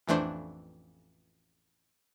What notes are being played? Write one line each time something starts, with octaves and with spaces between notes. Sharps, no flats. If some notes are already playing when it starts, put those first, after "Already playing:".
A1 F2 E3 A3 D4 C5